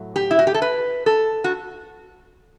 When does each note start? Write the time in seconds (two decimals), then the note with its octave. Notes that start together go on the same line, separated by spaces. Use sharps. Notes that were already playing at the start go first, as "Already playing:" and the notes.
Already playing: A2 F#3 A3
0.16 G4
0.31 E4
0.39 F#4
0.47 G4
0.54 A4
0.62 B4
1.06 A4
1.44 F#4